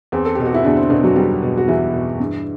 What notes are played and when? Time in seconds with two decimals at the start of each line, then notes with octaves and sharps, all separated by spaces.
0.12 E2 C4
0.25 A4
0.35 B2 G4
0.45 F#4
0.54 E4
0.64 E2 D3 D4
0.77 C4
0.90 B2 D3 D4
1.04 F#3 F#4
1.16 E2 G3 G4
1.43 B2
1.57 F#4
1.68 E2 E3 E4
1.94 B2
2.20 G2